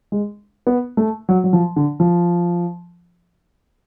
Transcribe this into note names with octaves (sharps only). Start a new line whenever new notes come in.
G#3
B3
A3
F#3
F#3
F3
D3
F3